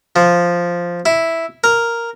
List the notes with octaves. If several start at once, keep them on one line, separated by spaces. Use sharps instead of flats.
F3
E4
A#4